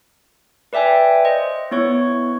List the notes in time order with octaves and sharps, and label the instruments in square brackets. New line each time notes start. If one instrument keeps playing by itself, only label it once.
[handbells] B4 D5 E5 G5 G#5
C5 D#5
B3 E4 C#5 C#6